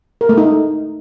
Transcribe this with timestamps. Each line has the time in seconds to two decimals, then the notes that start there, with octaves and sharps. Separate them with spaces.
0.21 A#4
0.29 A3
0.38 D#4